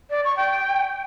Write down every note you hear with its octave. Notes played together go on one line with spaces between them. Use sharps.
D5
C#6
G5